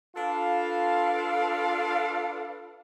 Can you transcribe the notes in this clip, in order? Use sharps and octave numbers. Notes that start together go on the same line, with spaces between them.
D4 F4 A4 B4 F5